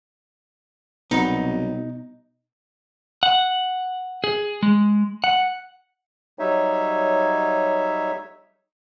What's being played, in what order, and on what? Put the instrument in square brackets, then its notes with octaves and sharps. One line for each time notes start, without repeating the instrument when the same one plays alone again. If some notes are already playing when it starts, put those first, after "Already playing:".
[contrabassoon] C2 [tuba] B2 [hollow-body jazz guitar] F#3 B3 [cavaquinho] D#4
[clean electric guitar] F#5
G#4
G#3
F#5
[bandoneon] F#3 G3 D#4 C#5 E5